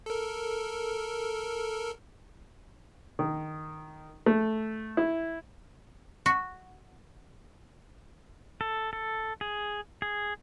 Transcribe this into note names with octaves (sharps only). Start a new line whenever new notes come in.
A4 A#4
D#3
A3
E4
F#4
A4
A4
G#4
G#4